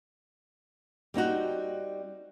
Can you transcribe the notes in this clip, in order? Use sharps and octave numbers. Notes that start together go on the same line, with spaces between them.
G3 C4 D#4 F#4